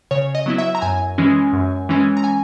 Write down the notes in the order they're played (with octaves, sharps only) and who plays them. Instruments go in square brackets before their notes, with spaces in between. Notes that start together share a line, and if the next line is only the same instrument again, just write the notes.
[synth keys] C#3 C#5
D#5
F#3 B3 E4
E5
A#5
F#2 G#5
E3 G#3 C#4
F#2
E3 G#3 C#4
A#5
G#5